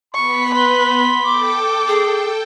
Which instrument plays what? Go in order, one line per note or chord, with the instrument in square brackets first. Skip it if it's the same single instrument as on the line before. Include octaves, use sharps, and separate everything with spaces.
[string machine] B3 B6 [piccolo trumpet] B5 [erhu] C#6
[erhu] B4 [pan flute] C6
[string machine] A4 G5 [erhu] D6
[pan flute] G#4